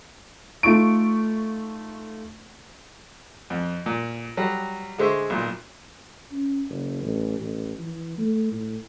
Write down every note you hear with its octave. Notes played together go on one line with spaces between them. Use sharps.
A3 D#4 F4 C#6 D7
F2
A#2
F#3 G3
D3 G#3 C5 E5 C#6
B1 A#2
C#4
F#1
A1
A1
E3
A3
A2